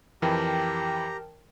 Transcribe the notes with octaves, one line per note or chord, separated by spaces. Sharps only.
F2 E3 G4 A#4 G5 A5 A#5